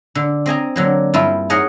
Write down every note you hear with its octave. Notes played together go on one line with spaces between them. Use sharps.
D3
C4 D#5 G#5 A#5
D3 F#3 A#3
G2 E4 F4
D#4 G#4 A#4 C#5 D#5 F#5